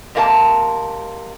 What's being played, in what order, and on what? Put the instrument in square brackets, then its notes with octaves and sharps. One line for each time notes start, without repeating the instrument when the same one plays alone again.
[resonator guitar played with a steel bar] G#2 C3 A#3 A4 A5